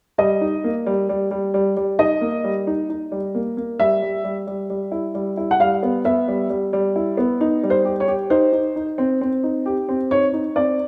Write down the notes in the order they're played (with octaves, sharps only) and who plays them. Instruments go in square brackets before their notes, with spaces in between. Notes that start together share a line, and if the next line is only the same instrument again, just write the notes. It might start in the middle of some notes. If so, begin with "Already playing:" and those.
[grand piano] G3 [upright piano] D#5
[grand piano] D#4
A#3
G3
G3
G3
G3
G3
[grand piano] D#4 [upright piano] D#5
[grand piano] A#3
G3
D#4
D#4
G3
A#3
A#3
[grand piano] G3 [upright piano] E5
[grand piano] G3
G3
G3
G3
E4
G3
E4
[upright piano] F#5
[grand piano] G3 [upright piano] F5
[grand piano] B3
[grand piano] B3 [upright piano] E5
[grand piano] G3
G3
G3
E4
B3
D#4
G3
[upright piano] C5
[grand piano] G4
[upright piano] C#5
[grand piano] G4
[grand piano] D#4 [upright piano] C5
[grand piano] D#4
D#4
C4
C4
D#4
G4
C4
[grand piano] D#4 [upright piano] C#5
[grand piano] D#4
[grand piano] C4 [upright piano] D5